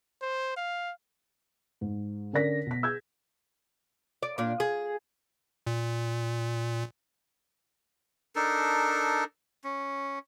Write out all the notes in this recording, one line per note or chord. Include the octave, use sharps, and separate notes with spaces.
C5
F5
G#2
D3 C#4 A#4 D5 A#6 B6
B2 B6
G#4 E6 G6 G#6
D5
A#2 D4
G#4
A#2
D4 D#4 A4 A#4
C#4